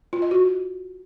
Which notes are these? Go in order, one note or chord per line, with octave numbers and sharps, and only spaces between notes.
F4
D#5
F#4